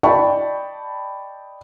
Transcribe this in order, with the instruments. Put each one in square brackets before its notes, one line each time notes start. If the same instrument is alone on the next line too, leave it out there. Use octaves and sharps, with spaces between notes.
[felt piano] D5 D#5 G5 A5 B5 C#6